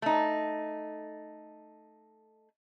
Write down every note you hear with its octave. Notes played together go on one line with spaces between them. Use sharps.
A3 D#4